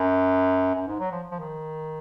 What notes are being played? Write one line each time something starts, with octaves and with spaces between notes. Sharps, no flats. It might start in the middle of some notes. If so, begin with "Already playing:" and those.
Already playing: F#2
F#2
G#2
F#3
F3
F3
D#3